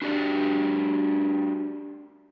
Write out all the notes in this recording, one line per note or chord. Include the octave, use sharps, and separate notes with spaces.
D4 F#4 G4 C#5 D5